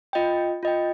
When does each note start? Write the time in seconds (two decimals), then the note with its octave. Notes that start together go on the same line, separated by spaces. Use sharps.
0.13 F4 D#5 G5
0.63 F4 D#5 G5